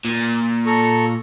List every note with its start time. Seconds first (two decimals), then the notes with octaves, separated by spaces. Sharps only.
0.05 A#2
0.66 A4 A#5 C#6